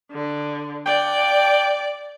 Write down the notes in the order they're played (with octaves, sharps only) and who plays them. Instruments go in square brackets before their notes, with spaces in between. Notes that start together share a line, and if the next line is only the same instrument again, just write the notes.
[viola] D3
[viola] D5 [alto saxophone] G5